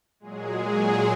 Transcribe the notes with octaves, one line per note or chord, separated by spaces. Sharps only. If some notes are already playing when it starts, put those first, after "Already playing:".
A#2 F#3 G#3 G#4